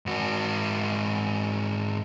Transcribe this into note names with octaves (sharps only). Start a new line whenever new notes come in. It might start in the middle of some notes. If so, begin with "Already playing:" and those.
G#2 F#4